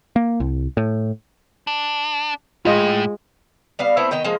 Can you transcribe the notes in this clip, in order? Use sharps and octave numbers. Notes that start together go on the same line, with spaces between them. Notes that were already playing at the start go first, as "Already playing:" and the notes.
A#3
C2
A2
D4
A2 G#3 F4 D#5
G3 B3 F5
A3 B3 C4 E4
D#3 B3 D#5 G5
F3 G#3 A#3